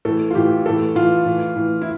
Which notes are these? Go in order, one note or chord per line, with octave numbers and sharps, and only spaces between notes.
A2 E3 A4
F4
A2 E3 G4
A2 E3 A4
A2 E3 F4
A2 E3
A2 E3
E4